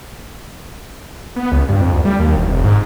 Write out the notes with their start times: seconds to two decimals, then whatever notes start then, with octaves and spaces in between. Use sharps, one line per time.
1.36 B3
1.52 C#2
1.69 G2
1.81 F2
1.94 D2
2.05 G3
2.19 D#2
2.36 E1
2.48 F1
2.64 G#2